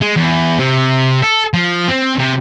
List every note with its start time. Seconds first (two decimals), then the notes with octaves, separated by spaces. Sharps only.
0.01 G#3
0.16 E2
0.59 C3
1.22 A4
1.54 F3
1.88 C4
2.19 C3